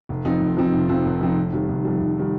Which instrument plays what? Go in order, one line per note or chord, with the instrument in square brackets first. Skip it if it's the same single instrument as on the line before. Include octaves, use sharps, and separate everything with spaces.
[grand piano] F1
F2 F3 C4 D#4
F1
F2 F3 C4 D#4
F1
F2 F3 C4 D#4
F1
F2 F3 C4 D#4
F1
F2 D#3 G3
F1
F2 D#3 G3
F1
D#3 G3